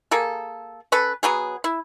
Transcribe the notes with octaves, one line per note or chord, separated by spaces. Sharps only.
A#3 G#4 A4
C#4 A4 B4
F#3 B3 G#4
E4